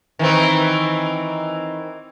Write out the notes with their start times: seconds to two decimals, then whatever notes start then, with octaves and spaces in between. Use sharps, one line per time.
0.19 D#3 E3 C4